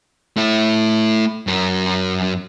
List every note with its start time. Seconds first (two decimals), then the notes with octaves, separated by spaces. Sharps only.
0.37 A3 E4
1.47 F#2 A#4